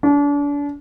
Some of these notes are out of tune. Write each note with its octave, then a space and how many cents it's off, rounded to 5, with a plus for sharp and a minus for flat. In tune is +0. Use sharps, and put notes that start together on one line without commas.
D4 -35